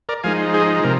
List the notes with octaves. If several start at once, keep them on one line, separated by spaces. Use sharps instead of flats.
A#4 D5
F3 G#3 D#4 F5 G#5
G#4 C5
C3 F3 A#4